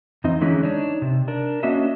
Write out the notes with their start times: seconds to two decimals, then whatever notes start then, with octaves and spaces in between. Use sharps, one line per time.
0.24 F2 E3 C4 D#4 D#5
0.41 D3 E3 G#3 C#4 D#4 E4
0.63 D4 D#4 C#5 D5
1.02 C3
1.28 D4 A#4
1.63 A#3 C#4 D4 F#4 D#5 E5